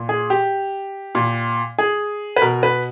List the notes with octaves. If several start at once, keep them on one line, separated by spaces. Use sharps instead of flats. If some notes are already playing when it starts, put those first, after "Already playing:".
Already playing: A#2
G#4
G4
A#2
G#4
B4
B2 A#4
B4